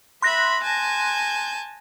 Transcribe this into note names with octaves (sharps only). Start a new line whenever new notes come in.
E5 B5 C6 F#6 A#6
G#5 A5 G6